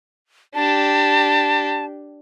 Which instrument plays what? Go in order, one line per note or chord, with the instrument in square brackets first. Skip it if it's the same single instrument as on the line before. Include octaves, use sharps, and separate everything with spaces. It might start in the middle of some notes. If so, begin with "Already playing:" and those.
[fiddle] D4 G4 [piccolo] A5